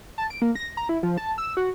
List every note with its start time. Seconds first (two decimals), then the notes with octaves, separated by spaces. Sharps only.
0.18 A5
0.30 D7
0.42 A#3
0.55 A#6
0.77 A#5
0.89 E4
1.03 F3
1.18 A5
1.38 E6
1.57 F#4